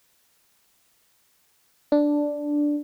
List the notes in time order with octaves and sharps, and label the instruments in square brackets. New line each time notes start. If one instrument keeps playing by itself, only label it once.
[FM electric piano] D4